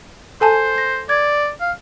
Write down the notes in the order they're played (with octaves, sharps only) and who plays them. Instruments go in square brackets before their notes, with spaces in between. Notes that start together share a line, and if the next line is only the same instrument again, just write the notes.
[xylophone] A4 G#5 A5 [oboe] C5
[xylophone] A#6
[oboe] D5 [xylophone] G#6
[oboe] F5